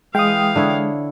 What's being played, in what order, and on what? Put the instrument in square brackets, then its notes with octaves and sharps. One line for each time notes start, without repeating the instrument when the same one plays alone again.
[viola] E3 F5 [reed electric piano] G#3 [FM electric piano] G5 D#6
[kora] D3 E4 C#5